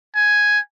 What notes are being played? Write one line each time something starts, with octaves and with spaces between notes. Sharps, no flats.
G#5